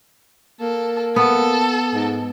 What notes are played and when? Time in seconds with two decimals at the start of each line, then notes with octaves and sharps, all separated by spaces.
0.61 A#3 A4
1.16 B3 A4
1.94 G#2